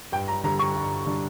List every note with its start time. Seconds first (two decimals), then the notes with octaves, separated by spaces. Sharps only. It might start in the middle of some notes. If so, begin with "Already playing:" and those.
0.12 G2 G5
0.28 A#5
0.44 D3 G3 D4 A#5
0.59 C#6
0.75 G2
1.06 D3 G3 D4